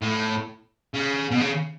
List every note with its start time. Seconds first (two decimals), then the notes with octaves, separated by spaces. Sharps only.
0.02 A2
0.94 C#3
1.31 B2
1.41 C#3